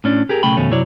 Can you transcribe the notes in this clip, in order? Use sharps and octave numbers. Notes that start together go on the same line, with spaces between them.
A2 C#4 D4
G4 G#4 A#4
B1 C#3 A3 G5 B5
F2 B2 D#3 A3 C#4
F#2 C3 F#3 E4 C#5 D5